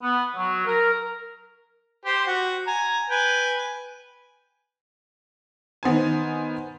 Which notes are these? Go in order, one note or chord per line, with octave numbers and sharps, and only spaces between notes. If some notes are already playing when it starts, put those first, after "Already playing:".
B3
F#3
A#4
G4 C5
F#4
G#5 A#5
B4 G5 G#5
D#3 B3 C5 G#5